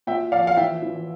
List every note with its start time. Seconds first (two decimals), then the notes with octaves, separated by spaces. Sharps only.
0.07 A#2 E5 G5
0.32 F3 D5 F5
0.47 F5
0.57 E3 E5 G5
0.82 E3